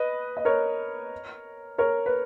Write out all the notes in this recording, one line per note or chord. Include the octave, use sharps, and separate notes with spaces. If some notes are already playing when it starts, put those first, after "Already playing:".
Already playing: B4 D#5
D#5
A#4 C#5
A#4 C#5
B4